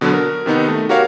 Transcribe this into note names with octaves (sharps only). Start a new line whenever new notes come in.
B2 D3 F#3 B3
A#4
C3 D#3 B3 D#4
A3
F#4 G4 A#4 C#5 F5